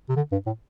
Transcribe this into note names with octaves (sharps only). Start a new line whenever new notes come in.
C3
D3
G2
A2